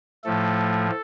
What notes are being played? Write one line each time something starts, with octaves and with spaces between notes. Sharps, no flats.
A2 F3 A3 A4